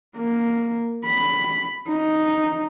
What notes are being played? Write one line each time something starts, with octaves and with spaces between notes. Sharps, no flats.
A#3
B5
D#4